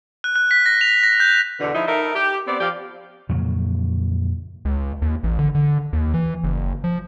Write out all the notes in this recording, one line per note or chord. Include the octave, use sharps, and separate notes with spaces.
F#6
F#6
B6
A#6
F7
A#6
G6
E2 B2 D3
F3 D#4 E4
D#4 E4 A4 A#4
G4
B3 C4 D5
F3 G4 D5 F5
F2 A#2 C#3 F#3
C#2
D#2
A1
D3
D3
D#2
E3
F#1
F3